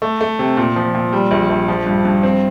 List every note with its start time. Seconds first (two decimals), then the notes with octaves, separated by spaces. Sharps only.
0.02 A3
0.21 A3
0.39 C3
0.57 A#2
0.76 F3
0.95 A#2
1.13 G3
1.31 A#1
1.50 A#1
1.68 F3
1.86 G2
2.05 G2
2.23 C4